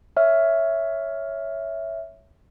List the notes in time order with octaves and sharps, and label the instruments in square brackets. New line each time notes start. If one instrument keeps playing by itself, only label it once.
[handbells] C#5 E5 F6